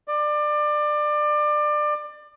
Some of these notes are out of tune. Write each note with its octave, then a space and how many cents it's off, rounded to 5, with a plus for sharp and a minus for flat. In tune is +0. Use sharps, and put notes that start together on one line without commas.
D5 +25